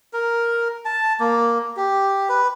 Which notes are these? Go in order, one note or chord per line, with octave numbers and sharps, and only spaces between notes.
A#4
A5
A#3
G4
B4